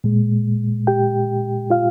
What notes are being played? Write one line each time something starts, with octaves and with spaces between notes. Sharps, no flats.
A#2 G#3
G4 G5
F4 F5